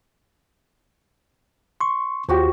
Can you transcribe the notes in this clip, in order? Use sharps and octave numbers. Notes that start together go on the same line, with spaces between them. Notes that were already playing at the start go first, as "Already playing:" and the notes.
C6 C#6
D#2 F3 F#4 G4